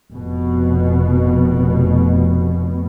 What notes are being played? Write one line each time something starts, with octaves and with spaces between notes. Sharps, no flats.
F1 B2